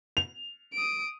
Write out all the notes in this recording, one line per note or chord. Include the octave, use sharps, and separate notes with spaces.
F7
D#6 D7